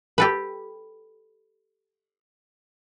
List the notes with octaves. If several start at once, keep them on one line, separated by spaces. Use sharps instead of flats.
G4 A4 B4